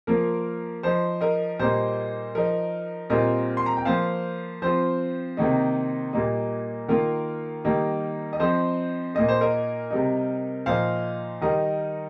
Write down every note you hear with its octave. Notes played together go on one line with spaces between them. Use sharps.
F3 A#3 F4 A#4
F3 D#4 C5
A#4 D#5
A#2 G3 A#3 D#4 C5
F3 D#4 A#4
A#2 G3 C4 F4 A#4 D#5
C6
A#5
G5
F3 A#3 F4 C5 F5
F3 C4 F4 C5
C3 D#3 A#3 D#4
A#2 G3 A#3 D#4
D#3 A#3 F4 A#4
D#3 G3 A#3 D#4
D#5
F3 C4 D#4 C5
A#2 A#3 D#4 D#5
C5
A#4 D#5
C3 G3 D#4
A#2 F3 D#4 C5 F5
D#3 G3 D#4 A#4 D#5